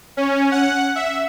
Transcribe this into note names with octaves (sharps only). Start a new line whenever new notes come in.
C#4
F#5
E5